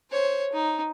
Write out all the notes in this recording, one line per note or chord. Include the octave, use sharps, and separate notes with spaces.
C5 C#5
D#4